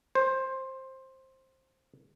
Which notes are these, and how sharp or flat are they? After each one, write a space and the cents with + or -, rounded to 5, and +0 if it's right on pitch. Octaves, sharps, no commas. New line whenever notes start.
C5 +15